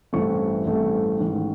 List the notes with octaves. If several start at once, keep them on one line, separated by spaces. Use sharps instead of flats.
A1 G2 E3 A3 C4 C#6
A1 G2 E3 A3 C4
A1 G#2 D#3